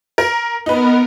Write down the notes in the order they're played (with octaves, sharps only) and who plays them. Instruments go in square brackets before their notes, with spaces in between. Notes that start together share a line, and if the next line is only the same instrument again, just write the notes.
[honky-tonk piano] A#4
[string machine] B3 A#4 [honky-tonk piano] D#4 B4